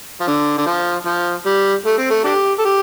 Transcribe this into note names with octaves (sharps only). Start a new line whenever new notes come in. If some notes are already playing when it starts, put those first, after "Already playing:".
F3
D3
D3
F3
F3
G3
A3
C4
A3
D4 G4
A4
G4